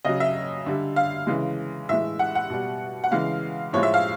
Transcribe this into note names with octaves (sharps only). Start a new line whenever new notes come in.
C#3 F#3 D#5
E5
D3 G3
F5
C#3 E3 G#3
A2 E3 G#3 E5
F#5
F#5
B2 G3
F#5
C#3 E3 G#3 F5
A2 F3 G#3 C#5
E5
F5